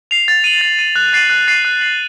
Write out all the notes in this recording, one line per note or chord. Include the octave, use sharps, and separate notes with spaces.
C7 F7
A6
D#7 F#7
A6
D#7 F#7
F#6
A6 C7 D#7 F#7
F#6
A6 C7 D#7 F#7
F#6
C7 F#7